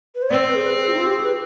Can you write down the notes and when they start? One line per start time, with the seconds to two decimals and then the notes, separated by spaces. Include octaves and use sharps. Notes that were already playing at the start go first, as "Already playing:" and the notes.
0.15 B4
0.22 C5
0.30 C4 D5
0.47 B4
0.55 G#4
0.64 B4
0.75 G#4
0.87 F4
0.93 D#4
0.98 F4
1.07 G4
1.15 G#4
1.23 B4